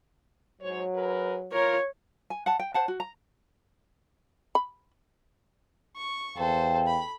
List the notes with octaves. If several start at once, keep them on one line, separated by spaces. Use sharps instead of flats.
G#2 F#3 C5 C#5
G#4 A#4 B4
F4 A#4 C#5
G#5
F#5 A5
G5
C5 F#5 A5
F#4
A#5
B5
C#6
E2 A4 C5 F5 G5
B5